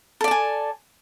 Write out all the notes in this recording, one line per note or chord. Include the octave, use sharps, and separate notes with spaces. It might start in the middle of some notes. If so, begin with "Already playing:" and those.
A4 D5 G#5 A5